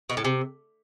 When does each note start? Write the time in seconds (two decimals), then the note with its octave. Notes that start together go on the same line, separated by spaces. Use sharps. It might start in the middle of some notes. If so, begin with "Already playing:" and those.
0.10 B2
0.17 A2
0.25 C3